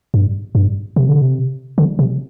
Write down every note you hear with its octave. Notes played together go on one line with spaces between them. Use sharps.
G2
G2
C3
D3
C3
D3
C3